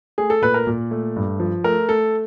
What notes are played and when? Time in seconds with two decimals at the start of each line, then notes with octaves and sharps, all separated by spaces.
0.18 A3 G#4
0.30 A4
0.42 A#2 B4
0.54 A#4
0.67 A#2
0.91 A3
1.16 G2
1.40 F3
1.64 A3 A#4
1.89 A3 A4